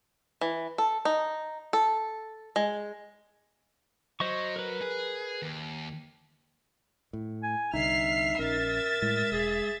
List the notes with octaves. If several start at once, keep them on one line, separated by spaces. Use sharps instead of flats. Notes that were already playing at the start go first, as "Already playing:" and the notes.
E3
A4
D#4
A4
G#3
F#3 C5 D#5 C#6
A#4 B4
G#4
D#2
A2
G#5
C2 D3 D#4 E5 F6 C7
A#1 C#4 A#4 E5 A6
A2 G#3
E1 G#4